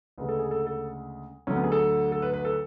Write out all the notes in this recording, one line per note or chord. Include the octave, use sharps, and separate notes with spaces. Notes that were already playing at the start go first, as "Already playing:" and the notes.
D2 C#3 G#3 B4
A4
G#4
A4
A4
D2 D3 F#3 C#4
B3
G#4
A4
A4
B4
B4
A4